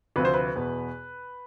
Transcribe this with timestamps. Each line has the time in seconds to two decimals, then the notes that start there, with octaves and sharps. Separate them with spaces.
0.16 D2 C3 F3 C4 B4
0.25 C5
0.34 B4
0.56 E2 B2 B3